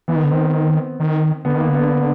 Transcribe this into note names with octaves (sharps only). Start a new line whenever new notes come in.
E3 B3
D#3
D3
D#3 C4
C4
D#3
D3 B3
D#3 A#3
D3
B3